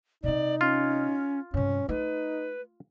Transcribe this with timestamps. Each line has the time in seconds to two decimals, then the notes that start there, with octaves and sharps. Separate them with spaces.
0.24 C3 C4 D#4 D5
0.61 C#4 F4
1.54 G2 C3 C#4
1.89 A3 D#4 B4